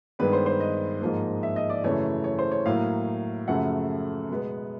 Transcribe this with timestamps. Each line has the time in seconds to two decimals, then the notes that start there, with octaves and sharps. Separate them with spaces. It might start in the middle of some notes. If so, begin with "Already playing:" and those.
0.19 G2 D#3 G#3 B3 B4
0.33 C5
0.46 C5
0.60 D#5
1.01 G#2 F3 A#3
1.43 E5
1.56 D#5
1.70 D5
1.84 F#2 C#3 E3 A3 C#5
2.24 C#5
2.39 C5
2.51 C#5
2.66 A2 F#3 A#3 F5
3.47 F#2 C#3 F3 A3 F#5
4.30 B2 G#3 B3